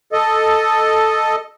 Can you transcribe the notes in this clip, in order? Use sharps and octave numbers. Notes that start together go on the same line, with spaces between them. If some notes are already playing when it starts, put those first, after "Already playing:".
A4 D#5